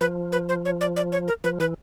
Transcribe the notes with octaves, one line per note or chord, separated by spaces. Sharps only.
F3 B4
B4
C5
C#5
D5
D5
C#5
A#4
F3 B4
E3 B4